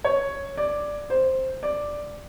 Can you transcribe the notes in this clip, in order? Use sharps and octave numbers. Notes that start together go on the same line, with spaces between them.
C#5
D5
C5
D5